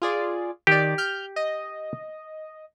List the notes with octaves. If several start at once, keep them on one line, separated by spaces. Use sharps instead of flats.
F4 G#4 D5
D#3 G4 D5
F6 G6
D#5